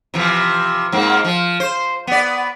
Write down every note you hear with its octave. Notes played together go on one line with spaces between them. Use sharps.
C3 E3 F3
G#2 A#3 C4
F3
C5
B3 D5